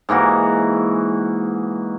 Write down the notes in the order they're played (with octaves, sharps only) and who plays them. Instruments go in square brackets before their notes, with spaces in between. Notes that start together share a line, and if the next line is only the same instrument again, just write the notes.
[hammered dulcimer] G#2 E3 A#3 F#4